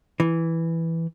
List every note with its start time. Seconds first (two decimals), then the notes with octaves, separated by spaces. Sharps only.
0.20 E3